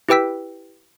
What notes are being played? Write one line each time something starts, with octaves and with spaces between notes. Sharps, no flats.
E4 G4 B4 G5 E6 B6